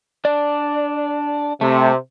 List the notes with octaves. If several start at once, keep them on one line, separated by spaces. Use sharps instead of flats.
D4 D5
C3 A3